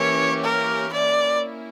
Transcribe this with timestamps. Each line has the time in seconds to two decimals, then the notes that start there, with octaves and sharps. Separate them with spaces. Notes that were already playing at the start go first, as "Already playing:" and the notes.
Already playing: E3 A#3 C#4 G4 C#5
0.43 A#4
0.93 A#3 C#4 E4 D5